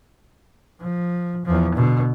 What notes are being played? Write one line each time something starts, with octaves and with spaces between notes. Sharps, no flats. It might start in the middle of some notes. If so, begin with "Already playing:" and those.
F3
E2 F3
B2 D3